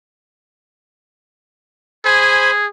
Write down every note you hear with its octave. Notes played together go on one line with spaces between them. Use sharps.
G#4 C5 G#5 B5